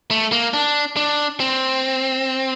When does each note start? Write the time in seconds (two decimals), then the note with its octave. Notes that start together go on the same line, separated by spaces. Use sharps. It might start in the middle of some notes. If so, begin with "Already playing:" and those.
0.11 A3
0.32 A#3
0.54 D4
0.96 D4
1.40 C4